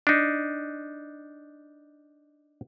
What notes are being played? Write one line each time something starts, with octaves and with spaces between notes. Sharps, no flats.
D4 D#4